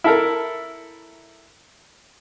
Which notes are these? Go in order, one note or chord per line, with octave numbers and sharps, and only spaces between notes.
E4 A4 A#4